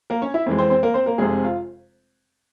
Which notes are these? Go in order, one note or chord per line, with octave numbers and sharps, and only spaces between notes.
A#3 A#4
C#4 C#5
E4 E5
F2 E3 G#3
C4 C5
C4 C5
A#3 A#4
C4 C5
A#3 A#4
F1 F2 C3 G#3 G#4
F4